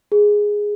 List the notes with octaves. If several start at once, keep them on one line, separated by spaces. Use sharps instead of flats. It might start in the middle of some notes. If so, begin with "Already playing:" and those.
G#4